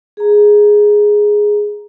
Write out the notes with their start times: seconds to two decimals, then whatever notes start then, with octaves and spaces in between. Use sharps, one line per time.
0.17 G#4 A#5